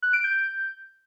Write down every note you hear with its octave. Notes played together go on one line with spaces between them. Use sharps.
F#6
D7
G6